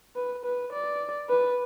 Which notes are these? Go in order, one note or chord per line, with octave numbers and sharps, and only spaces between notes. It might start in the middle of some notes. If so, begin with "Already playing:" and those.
B4
B4
D5
B4